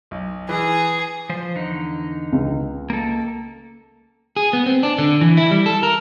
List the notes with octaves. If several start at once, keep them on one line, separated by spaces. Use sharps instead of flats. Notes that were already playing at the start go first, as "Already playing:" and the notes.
B1
E3 G#4
F3 C5
E2 D3 D#4
C#2
A#3 A4
G#4
B3
C4
D4
D3
E3
E4
G3
A4
A#4